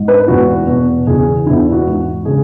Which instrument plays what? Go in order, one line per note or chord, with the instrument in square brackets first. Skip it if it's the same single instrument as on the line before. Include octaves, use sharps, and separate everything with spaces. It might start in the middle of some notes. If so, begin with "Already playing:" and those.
Already playing: [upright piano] G#2
B4
E2 E3 F#4
E2 B2
E2 C#3 E3 G#4
E2 E3 E4
E4
F#4
G#2 E3
C#3 G#4